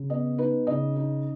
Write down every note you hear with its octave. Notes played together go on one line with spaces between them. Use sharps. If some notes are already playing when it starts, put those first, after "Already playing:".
Already playing: C#3
B3 D#5
D#4 B4
C#3 D#5
D#4